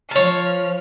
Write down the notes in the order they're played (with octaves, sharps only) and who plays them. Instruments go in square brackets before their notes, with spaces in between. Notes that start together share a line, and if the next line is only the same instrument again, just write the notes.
[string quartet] F3 F6 [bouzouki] C#5 A5